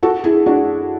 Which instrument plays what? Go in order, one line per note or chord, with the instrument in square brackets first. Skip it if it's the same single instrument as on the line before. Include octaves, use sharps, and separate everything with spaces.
[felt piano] F#4 A4
E4 G#4
D4 F#4